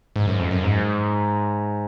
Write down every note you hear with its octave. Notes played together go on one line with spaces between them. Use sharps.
G#2
F#2
F2
F#2
G#2